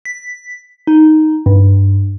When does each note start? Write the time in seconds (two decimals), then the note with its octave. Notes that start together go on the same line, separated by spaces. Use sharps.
0.05 B6
0.87 D#4
1.46 G2